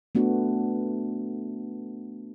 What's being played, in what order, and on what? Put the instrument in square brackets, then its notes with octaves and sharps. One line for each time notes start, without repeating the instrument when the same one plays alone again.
[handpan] A3 B3 D4 F#4